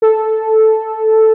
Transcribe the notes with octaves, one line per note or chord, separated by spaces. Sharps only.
A4